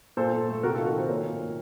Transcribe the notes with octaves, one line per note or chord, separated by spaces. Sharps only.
A#2 A4 C5
A#2
A3
C3 F#4 A#4
F4 A4
D#3
F#4 A#4
D#3 A4 C5
A#2 A#4 C#5
A#2
A#2